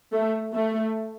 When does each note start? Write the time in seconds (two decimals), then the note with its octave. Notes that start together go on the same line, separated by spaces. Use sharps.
0.13 A3
0.54 A3